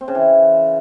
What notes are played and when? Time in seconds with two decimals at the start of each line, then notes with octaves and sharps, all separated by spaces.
0.01 C4
0.08 C#3
0.15 E3